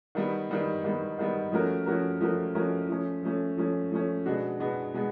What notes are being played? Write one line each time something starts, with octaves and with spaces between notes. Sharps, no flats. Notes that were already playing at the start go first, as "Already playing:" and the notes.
D#3 G3 B3
D#3 G3 B3
D#3 G3 B3
D#3 G3 B3
F3 A3 C#4 F#4 A#4
F3 A3 C#4 F#4 A#4
F3 A3 C#4 F#4 A#4
F3 A3 C#4 F#4 A#4
F3 A3 C#4
F3 A3 C#4
F3 A3 C#4
F3 A3 C#4
B2 G#3 B3 D4 F#4
B2 G#3 B3 D4 F#4
B2 G#3 B3